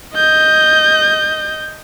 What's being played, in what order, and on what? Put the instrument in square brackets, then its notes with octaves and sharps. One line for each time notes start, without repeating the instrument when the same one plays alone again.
[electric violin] D#5 G6